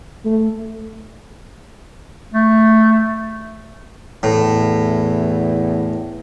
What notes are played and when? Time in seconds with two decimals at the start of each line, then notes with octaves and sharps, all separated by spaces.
0.25 A3
2.34 A3
4.23 E2 A2